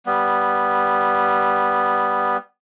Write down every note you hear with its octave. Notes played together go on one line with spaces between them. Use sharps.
G3 B3